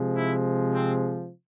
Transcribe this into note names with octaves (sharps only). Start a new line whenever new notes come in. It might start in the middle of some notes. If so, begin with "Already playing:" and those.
Already playing: C3 F3 G#3
E4
C4